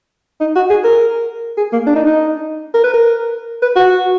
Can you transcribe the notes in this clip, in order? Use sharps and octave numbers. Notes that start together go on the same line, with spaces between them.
D#4
F#4
G#4
A#4
G#4
A#3
D4
D#4
D#4
A#4
B4
A#4
B4
F#4